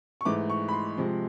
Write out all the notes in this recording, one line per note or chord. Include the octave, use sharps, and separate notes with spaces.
C#6
G#2 E3 A3 D6
C#6
B5
C6
C3 F3 G#3